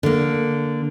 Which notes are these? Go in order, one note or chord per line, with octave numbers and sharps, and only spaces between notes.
D3 A#3